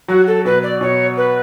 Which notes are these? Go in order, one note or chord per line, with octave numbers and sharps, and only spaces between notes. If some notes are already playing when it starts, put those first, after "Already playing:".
F#3 F#4
A4
B2 B4
D5
B2 C#5
B4